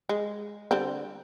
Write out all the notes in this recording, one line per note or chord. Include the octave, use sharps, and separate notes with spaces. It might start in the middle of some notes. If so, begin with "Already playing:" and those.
G#3
D3 G3 C4